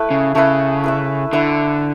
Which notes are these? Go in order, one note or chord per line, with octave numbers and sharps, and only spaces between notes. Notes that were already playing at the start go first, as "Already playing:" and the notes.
Already playing: A3 E4 B4
C#3
C#3 A3 E4 B4
E4 B4 E5
D3 E4 B4 E5